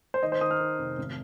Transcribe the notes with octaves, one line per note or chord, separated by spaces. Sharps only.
C5
D#3 D#5
C5
D#3 D#6
F6
D#3
F1
G#1